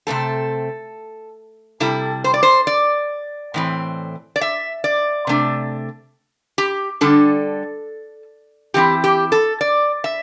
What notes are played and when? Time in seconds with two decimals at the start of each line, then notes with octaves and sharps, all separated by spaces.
0.07 C3 A3 C4 A4
1.80 C3 G3 E4 A4
2.24 C5
2.34 D5
2.43 C5
2.67 D5
3.54 A2 E3 C4
4.36 D5
4.41 E5
4.84 D5
5.27 C3 A3 D4
6.58 G4
7.01 D3 G3 D4 A4
8.74 E3 C4 E4 G4
9.04 G4
9.32 A4
9.61 D5
10.04 E5